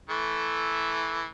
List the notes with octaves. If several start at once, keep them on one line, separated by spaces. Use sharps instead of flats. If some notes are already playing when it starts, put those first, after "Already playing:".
E3 A3